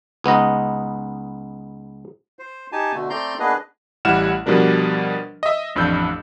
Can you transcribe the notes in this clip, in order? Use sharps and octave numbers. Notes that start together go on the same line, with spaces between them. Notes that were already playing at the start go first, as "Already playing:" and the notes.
C#2 B3 D#4 D#5
C5
D#4 G4 G#5 A5
B2 D3 A3
A3 C4 D5 A#5 C6 G6
A#3 B3 D4 G#4 B4 D#5
A1 G3 E4 F#5 F6 E7
B2 F3 G3 D4 A#4
D#5 E5
A1 F2 D4 E6 G6